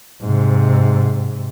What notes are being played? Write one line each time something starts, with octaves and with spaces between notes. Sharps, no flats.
G#2 C3